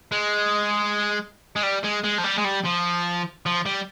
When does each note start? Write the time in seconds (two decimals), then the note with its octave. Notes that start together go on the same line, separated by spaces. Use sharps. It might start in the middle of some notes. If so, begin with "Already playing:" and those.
0.12 G#3
1.56 G#3
1.63 G3
1.84 G#3
2.04 G#3
2.18 F3
2.24 G3
2.38 G#3
2.44 G3
2.65 F3
3.46 F3
3.66 G3